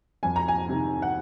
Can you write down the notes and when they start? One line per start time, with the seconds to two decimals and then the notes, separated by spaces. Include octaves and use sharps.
0.23 F2 G#5
0.36 A#5
0.48 G#5
0.69 C3 D#3
1.02 F#5